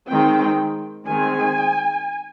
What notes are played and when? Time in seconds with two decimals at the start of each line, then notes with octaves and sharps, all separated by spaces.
0.09 D#3 G#3 C4 G5
1.07 D#3 G#3 C4 G#5